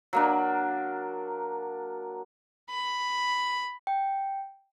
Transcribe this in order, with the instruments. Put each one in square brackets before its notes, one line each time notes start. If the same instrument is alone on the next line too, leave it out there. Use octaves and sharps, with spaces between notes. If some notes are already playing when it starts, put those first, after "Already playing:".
[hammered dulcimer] F#3 A#3 D4
[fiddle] B5
[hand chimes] G5